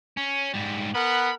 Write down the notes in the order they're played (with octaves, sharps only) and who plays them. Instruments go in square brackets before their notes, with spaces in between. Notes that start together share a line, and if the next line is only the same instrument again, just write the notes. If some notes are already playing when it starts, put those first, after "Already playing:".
[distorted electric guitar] C#4
G#2 G3
[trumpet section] B3 A#4 F#5 [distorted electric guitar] B5